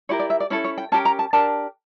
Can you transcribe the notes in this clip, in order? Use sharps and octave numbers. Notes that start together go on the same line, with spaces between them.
E4 G4 A#4 C#5
D5
E5
D5
C#4 E4 A4 C#5
C#5
G5
C#4 G4 A#4 A5
A#5
A5
D4 G4 A#4 A5